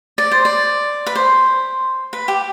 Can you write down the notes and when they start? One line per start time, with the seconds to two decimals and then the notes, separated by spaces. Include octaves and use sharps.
0.18 D5
0.32 C5
0.45 D5
1.06 B4
1.15 C5
2.13 B4
2.28 G4